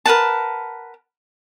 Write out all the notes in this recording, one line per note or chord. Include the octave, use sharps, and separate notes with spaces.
A#4 B4 F#5 A5